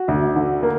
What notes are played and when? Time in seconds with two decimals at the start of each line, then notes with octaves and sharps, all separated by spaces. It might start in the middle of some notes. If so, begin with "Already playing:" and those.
Already playing: F#4
0.08 D2
0.36 D3
0.63 A#3